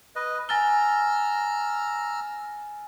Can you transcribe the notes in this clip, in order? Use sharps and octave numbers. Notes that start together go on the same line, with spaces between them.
B4 D#5
G#5 A#5 E6 F6 A6 G7